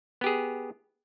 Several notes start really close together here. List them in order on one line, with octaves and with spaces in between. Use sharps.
B3 G4 G#4